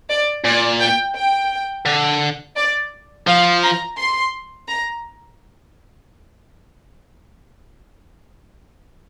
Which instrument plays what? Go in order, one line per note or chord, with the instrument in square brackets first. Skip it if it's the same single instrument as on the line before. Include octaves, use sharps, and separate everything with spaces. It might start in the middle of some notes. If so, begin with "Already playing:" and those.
[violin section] D5
[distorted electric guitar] A#2 [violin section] D5
[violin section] G5
G5
[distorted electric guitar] D3
[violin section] D5
[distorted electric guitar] F3 [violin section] F5
[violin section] A#5
C6
A#5